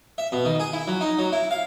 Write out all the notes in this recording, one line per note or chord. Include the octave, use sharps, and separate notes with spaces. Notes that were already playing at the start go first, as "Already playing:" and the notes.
E5
B2
D#3
G#4
E4
F#3
D#4
F#3
E4
F5